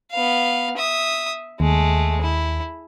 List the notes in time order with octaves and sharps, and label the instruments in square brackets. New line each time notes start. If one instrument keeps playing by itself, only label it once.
[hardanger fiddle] B3 F5
E5 D#6
[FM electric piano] D#2 [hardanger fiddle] G#3 A3
[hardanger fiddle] E4